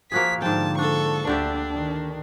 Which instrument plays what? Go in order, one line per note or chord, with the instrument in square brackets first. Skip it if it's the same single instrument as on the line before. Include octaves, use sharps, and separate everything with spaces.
[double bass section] F3 [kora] A#3 F#4 G#4 [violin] B6
[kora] G#2 G5 [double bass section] D3 F3 [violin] A5
[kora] D4 [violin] A4 C#6
[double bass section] D2 [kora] D3 G4 E5 [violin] D4
[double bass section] D#3